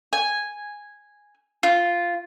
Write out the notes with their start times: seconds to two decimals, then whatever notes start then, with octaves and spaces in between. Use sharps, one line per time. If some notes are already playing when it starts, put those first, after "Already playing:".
0.13 G#5
1.63 F4